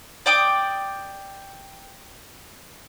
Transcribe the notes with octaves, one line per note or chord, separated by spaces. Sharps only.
D5 G5 D6 D#6